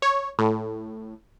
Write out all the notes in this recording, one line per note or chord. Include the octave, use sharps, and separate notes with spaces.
C#5
A2